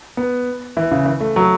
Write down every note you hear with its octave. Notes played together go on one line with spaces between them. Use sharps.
B3
E3
C#3
E3
A3
F#3